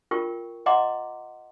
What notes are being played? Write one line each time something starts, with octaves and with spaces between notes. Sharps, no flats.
F4 A#4 G5 C#6
D#5 F#5 A#5 C6 D6